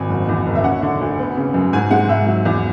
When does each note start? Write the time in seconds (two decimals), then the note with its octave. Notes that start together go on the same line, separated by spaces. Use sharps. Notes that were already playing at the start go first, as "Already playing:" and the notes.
Already playing: G#1 G#5
0.09 F#1
0.29 E2
0.46 F#1
0.55 E5
0.64 C#4 F#5
0.82 D3
1.01 D2
1.19 B3
1.37 C#3
1.54 F#2
1.73 G#2 G#5
1.91 G#3 F#5
2.09 G#2 E5
2.27 F#3
2.45 E2